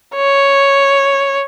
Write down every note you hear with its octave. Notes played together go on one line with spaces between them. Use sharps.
C#5